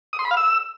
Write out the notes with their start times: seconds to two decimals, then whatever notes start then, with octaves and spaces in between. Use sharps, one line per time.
0.13 D#6
0.19 C6
0.25 B5
0.31 F5
0.37 E6